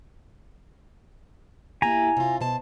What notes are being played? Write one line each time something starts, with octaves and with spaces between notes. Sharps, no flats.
A#3 E4 G4 G#5 A#5
C3 F4
B2 C5 A5